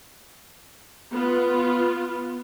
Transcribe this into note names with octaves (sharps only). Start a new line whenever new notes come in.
B3 F4